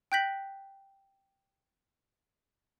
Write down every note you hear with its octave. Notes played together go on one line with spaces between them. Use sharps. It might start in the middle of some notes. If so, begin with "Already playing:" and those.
G5 F#6 G6 A#6 B6 F#7